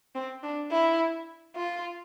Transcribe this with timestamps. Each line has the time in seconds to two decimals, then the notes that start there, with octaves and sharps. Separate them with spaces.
0.15 C4
0.43 D4
0.72 E4
1.57 F4